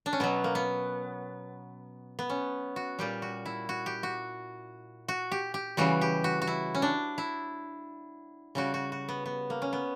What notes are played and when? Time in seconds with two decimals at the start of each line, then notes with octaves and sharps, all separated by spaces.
0.06 D4
0.13 C#4
0.20 B2 F#3 B3
0.44 A#3
0.55 B3
2.19 B3
2.30 C#4
2.76 F#4
2.99 A#2 G3 G4
3.22 F#4
3.46 E4
3.69 F#4
3.86 G4
4.03 F#4
5.08 F#4
5.31 G4
5.54 G4
5.77 C#3 E3 G3 F#4
6.01 G4
6.24 F#4
6.42 F#4
6.47 E4
6.75 C#4
6.82 D4
7.18 E4
8.55 C#3 G3 F#4
8.74 F#4
8.92 F#4
9.09 B3
9.26 B3
9.50 A#3
9.62 C#4
9.73 B3